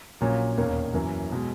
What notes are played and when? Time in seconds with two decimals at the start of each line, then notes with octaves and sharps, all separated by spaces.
0.21 A#1 A#2 F#3 C#4
0.57 E1 D#2 D#3 A#3 C#4
0.94 F#2 E3 A#3
1.32 B2 G#3